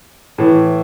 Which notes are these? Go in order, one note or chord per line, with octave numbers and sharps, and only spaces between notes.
A2 E3